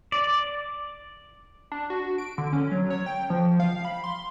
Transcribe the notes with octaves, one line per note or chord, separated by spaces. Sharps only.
D5
D4
F#4
D7
D3
C#4
F#3
C#5
G5
F3
F5
B5
C6